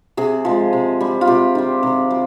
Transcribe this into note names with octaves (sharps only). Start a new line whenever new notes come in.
C3 G#4
F3 G#3
C3
G3
F4
C3 G4
D#3 G3
C3
G3